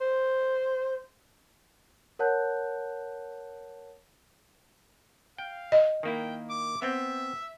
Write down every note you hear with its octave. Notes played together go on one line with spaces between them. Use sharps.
C5
A#4 C#5 F#5 A5 F#6 G6
F5 G5
D#5
D#3 A#3 E4 G5
D6
B3 C4 E5 G5